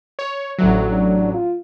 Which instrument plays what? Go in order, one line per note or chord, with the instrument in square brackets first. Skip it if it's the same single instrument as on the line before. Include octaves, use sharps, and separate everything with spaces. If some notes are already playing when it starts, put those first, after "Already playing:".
[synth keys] C#5
[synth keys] A1 F#3 [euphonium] D2
[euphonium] D4
F4